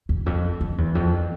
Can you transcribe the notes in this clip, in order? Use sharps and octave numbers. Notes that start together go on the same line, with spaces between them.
E2
F2
F2
E2
F2